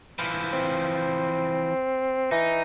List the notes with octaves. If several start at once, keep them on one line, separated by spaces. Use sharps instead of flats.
E3 F3
C4
E3 D#4